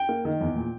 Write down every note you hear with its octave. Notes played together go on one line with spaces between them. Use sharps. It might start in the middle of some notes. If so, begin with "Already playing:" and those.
Already playing: G5
A#3
D#3
E2
A#2